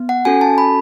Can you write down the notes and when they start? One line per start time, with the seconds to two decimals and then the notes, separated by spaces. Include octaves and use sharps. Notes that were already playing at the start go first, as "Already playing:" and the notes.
Already playing: B3
0.09 F#5
0.25 C#4 F#4 A4 G#5
0.41 A5
0.58 B5